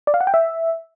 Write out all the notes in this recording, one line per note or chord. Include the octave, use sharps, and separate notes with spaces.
D5
F5
F#5
G5
E5